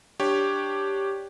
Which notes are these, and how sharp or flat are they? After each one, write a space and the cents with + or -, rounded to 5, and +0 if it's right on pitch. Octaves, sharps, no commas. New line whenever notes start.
D4 +0 G4 +0 C#5 +0